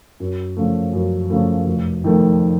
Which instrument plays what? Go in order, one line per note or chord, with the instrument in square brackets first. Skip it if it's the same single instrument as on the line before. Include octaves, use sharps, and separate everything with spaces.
[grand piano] F#2
C#3 F3 A3
F#2
C#3 F3 A3
F1
F2 D#3 A3